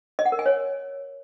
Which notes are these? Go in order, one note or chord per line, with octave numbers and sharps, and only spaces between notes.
D#5
F#5
A#4
G#5
C#5